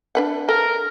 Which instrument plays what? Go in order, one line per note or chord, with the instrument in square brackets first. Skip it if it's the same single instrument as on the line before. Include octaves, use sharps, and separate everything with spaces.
[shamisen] D4 B4 F#5
[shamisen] A4 [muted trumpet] A#4